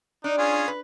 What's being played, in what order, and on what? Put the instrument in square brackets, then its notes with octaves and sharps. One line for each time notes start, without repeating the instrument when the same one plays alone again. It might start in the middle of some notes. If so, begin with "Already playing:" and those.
[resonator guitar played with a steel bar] D4 [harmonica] D#4
[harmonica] C#4 F4 G#4
[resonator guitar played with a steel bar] B4